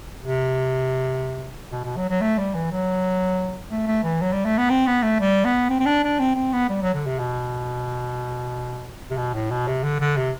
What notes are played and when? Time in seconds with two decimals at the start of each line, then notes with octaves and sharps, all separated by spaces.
0.23 C3
1.72 B2
1.84 B2
1.97 F#3
2.09 F#3
2.21 A3
2.38 G3
2.55 E3
2.71 F#3
3.71 A3
3.87 A3
4.04 E3
4.21 F#3
4.33 G3
4.45 A3
4.58 B3
4.70 C4
4.87 B3
5.03 A3
5.20 G3
5.45 B3
5.69 C4
5.80 C4
5.86 D4
6.03 D4
6.19 C4
6.35 C4
6.53 B3
6.69 G3
6.82 F#3
6.94 D3
7.06 C3
7.19 B2
9.10 C3
9.17 B2
9.34 A2
9.51 B2
9.67 C3
9.84 D3
10.00 D3
10.17 C3